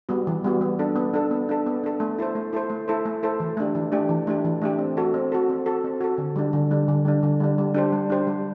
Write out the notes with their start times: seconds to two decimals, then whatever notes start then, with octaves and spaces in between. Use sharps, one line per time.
0.09 G3 B3 F#4
0.27 E3
0.44 G3 B3 F#4
0.61 B3
0.79 D4 A4
0.96 B3
1.14 D4 A4
1.31 B3
1.49 D4 A4
1.66 B3
1.84 D4 A4
2.00 A3
2.19 E4 A4 C5
2.35 A3
2.53 E4 A4 C5
2.70 A3
2.88 E4 A4 C5
3.05 A3
3.23 E4 A4 C5
3.40 E3
3.57 A3 D4 G4
3.75 E3
3.92 A3 D4 G4
4.09 E3
4.27 A3 D4 G4
4.45 E3
4.62 A3 D4 G4
4.79 C4
4.97 F#4 A4
5.14 C4
5.32 F#4 A4
5.49 C4
5.66 F#4 A4
5.84 C4
6.01 F#4 A4
6.18 D3
6.36 G3 D4
6.53 D3
6.71 G3 D4
6.88 D3
7.05 G3 D4
7.23 D3
7.40 G3 D4
7.58 G3
7.74 D4 G4 C5
7.93 G3
8.10 D4 G4 C5
8.27 G3